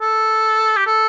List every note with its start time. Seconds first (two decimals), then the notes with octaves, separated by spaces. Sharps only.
0.01 A4
0.76 G4
0.87 A4